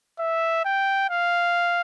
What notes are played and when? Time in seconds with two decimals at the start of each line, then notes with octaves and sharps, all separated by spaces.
0.19 E5
0.65 G5
1.10 F5